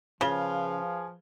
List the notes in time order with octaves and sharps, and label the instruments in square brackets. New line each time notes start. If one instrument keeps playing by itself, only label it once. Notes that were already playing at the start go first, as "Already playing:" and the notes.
[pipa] C#3 [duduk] F3 [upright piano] F4 G#4 G7 [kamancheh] B4 F5